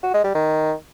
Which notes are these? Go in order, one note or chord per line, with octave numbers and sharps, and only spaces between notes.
F#4
G#3
G3
D#3